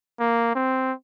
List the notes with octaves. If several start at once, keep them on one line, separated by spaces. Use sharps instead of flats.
A#3
C4